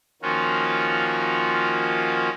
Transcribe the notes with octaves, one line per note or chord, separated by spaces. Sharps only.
D#3 F3 A#3 C#4 F4 F#4